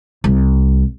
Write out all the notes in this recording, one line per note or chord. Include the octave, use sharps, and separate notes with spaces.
C2